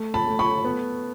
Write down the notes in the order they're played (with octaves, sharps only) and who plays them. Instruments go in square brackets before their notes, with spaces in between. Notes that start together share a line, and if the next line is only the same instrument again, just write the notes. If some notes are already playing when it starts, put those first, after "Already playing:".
Already playing: [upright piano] A3
A5 B5
A3
B5 C#6
B3